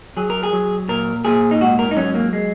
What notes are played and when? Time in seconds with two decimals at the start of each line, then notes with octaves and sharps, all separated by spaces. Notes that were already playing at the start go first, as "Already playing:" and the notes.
0.17 F#3 G#4
0.30 A#4
0.43 G#4
0.53 F#3
0.88 A#2 A#4
1.25 A#2 G#4
1.51 D#4
1.61 G#2 F#4
1.79 A#4
1.91 D#4
1.97 F#3 C#4
2.15 A#3
2.33 G#3